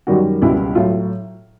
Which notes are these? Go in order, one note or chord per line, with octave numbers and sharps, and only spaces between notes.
F#2 D#3 G3 F#4
C#2 B2 G3 E4
A2 F#3 F4